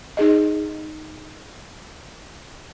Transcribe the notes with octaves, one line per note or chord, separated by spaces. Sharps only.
D#4 G#4 D#5